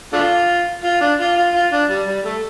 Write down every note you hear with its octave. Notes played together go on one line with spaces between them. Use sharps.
A3 D4 F4
F4
D4
F4
F4
F4
D4
G3
G3
A3